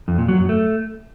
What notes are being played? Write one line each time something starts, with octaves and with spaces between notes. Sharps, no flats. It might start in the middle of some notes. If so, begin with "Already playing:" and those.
F2
A#2
F#3
F#2
A3